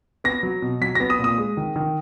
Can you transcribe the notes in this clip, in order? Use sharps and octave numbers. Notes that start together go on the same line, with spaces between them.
B3 A#6
F#3
B2
F#3 B6
B3 A#6
D#6
A#2
D#6
G#3
D#3
D#3